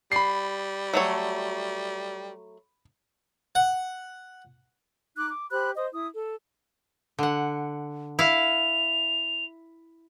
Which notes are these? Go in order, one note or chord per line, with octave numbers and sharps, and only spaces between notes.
G3 B5 C7
F#3 A3 C#5
F#5
D#4 D6 F#6
D6
G4 C5 B5 F#6
C5 D#5 D#6
E4 D#6
A4
D3 F#5
E4 F5 F7